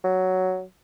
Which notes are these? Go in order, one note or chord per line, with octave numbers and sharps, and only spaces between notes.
F#3